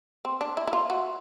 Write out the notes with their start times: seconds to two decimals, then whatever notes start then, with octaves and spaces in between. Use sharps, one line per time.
0.25 C4
0.41 D4
0.57 E4
0.67 E4
0.73 F4
0.90 F#4